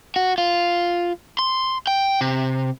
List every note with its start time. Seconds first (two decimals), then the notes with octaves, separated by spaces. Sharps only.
0.16 F#4
0.38 F4
1.39 C6
1.87 G5
2.21 C3